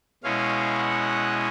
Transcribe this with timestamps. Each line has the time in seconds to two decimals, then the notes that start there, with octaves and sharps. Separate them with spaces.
0.23 B2 G#3 C#4 E4 F5
0.78 F#5